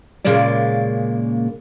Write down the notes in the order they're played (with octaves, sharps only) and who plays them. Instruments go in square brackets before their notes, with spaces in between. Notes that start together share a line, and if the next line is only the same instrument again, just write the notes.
[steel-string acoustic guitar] A#2 C#3 G#3 A#3 D5